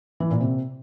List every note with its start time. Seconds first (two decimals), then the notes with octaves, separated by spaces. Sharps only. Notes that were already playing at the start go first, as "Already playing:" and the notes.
0.20 E3
0.30 A#2
0.40 C3